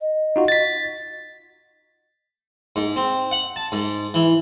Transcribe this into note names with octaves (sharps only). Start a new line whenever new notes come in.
D#5
D#4 F4 F#4
A6 B6
G#2
C4
F#5
A5
G#2
E3